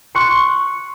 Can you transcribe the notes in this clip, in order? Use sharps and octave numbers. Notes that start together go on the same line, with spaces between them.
C6 C#6 F#6 C#7